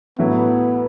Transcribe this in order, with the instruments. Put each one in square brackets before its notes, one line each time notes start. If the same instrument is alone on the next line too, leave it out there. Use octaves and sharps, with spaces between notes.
[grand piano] A2 F#3 A3 E4 [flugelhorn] B3